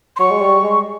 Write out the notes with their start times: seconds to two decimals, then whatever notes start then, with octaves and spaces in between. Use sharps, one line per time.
0.16 C6
0.19 F#3 C#6
0.31 G#3
0.41 G3
0.64 G#3